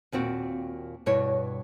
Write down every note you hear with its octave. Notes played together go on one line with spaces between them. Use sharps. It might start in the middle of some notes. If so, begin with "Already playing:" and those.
D#2 A#2 C4 F#4
G2 B2 E4 C#5